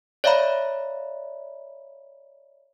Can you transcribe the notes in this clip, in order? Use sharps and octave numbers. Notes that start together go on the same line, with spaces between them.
C#5 D5 E5 F5 A#5 B5